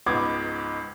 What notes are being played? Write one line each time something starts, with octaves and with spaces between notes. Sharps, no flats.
C#2 G#2 B3 D#4 D6 G#6